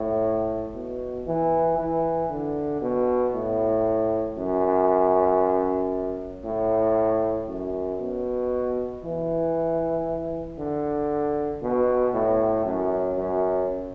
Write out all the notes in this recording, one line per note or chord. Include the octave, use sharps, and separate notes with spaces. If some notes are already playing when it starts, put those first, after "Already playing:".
Already playing: A2
B2
E3
E3
D3
B2
A2
F#2
A2
F#2
B2
E3
D3
B2
A2
F#2
F#2